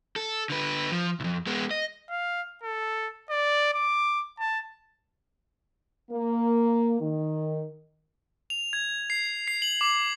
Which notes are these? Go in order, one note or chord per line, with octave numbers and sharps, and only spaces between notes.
A4
D3 B4
F3
C2 F2
G#3 B3
D#5
F5
A4
D5
D6
A5
A#3
D#3
F7
G#6
C7
C7
F#7
D6